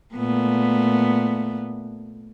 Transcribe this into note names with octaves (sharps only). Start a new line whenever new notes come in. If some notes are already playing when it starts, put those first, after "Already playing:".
A#2 A3 B3